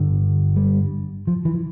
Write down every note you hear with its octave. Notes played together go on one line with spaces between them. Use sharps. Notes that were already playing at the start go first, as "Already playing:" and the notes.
Already playing: G1 G2 D3
G3
F3
E3